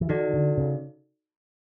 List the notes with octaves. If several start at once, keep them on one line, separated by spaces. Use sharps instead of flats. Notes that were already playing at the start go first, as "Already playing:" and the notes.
E3
D#3 D#4 F#4 A4 D5
D3
C#3